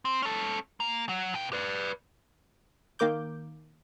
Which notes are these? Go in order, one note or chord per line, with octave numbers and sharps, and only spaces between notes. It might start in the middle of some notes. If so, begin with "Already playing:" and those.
C4
C#4 A4
A#3
F#3
B2 G5
B4 D5
D#3 A#3 A#4 D6 G6